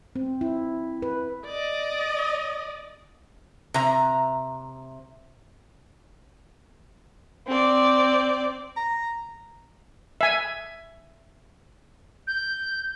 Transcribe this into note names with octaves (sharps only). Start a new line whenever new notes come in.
C4
E4
B4
D5 D#5
C3 A#5
C4 D5
A#5
E5 G#5
G6